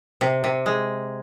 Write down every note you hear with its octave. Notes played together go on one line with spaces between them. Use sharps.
C3
C3
G#3